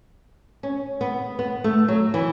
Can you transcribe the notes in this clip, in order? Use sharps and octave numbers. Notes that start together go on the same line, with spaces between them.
C#4
B3
B3
A3
F#3
E3